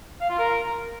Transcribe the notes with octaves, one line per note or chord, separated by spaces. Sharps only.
F5
F4
A#4